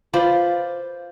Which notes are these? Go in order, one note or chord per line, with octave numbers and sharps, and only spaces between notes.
F4 B4 C5 D5